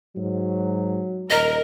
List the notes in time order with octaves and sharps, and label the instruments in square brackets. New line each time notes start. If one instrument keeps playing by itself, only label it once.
[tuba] G#2 [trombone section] F#3
[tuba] D#1 [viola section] A#4 [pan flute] D#5